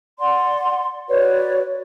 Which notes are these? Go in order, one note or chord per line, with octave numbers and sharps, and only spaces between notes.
D5 F#5 C6
F#4 B4 C#5 D5